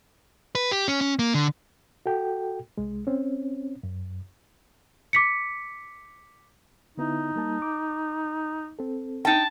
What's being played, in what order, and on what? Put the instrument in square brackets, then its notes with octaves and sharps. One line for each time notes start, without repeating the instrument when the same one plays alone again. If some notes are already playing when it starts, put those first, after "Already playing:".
[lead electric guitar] B4
G4
C#4
C#4
A#3
D3
[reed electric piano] F#4 A4 G5
C2 G#3
C4 C#4
F#2
[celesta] D6 B6 C#7
[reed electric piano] D3 B3 E4 [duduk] D#4
[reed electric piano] G3 A#3 A5
D6
C4 A4
[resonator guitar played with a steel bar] D#4 G5 [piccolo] A5